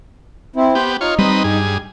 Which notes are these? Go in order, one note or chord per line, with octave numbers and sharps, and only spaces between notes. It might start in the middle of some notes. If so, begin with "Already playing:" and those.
C4 E4
B3 G4 C5
D#4 F4 C#5
G3 C4 B4 D#5
G2 G#4